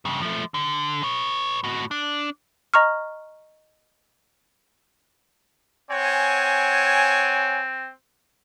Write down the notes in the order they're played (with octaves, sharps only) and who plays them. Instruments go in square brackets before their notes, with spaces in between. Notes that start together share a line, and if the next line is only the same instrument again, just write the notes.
[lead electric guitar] G2 C#3
F3 A3
D3
B4 C#5
A2 F#4
D4
[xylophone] D#5 A#5 C#6 F6
[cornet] C4 [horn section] C#5 F#5 G#5